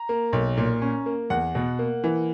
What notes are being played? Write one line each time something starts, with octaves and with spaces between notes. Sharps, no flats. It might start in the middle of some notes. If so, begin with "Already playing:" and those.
Already playing: A#5
A#3
B1
A#2
C#4
A#3
E2 F#5
B2
A#3
E3